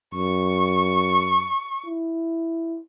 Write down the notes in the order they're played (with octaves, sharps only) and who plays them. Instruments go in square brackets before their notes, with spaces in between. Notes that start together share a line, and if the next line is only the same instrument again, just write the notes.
[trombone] F#2 [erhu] C#6
[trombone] E4